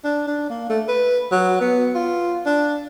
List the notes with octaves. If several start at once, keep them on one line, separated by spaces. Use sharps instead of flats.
D4
D4
A#3
A3
B4
F#3
B3
F4
D4